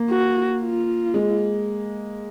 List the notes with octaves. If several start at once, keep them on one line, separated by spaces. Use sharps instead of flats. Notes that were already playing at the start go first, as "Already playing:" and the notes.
Already playing: A#3
F#4
F4
G#3